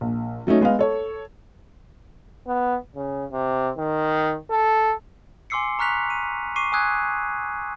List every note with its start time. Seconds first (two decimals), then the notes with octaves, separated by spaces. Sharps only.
0.01 A#1
0.47 F#3 A3 C#4 D#4
0.61 G#3 B3 D#5 F5
0.79 A4 C#5
2.47 B3
2.96 C#3
3.32 C3
3.77 D#3
4.51 A4
5.50 G#5 C6 D6 E6 C7 C#7
5.79 A#5 C#6 F6 F#6 B6 F7
6.10 D#7
6.56 C#6 D6 C7 D#7
6.72 G#5 D#6 E6 F#6 G#6